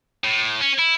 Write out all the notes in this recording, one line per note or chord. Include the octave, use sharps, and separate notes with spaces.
A2
C#4
E4